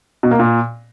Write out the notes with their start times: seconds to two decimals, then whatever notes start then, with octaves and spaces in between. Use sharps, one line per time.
0.23 B2
0.31 A#3
0.39 A#2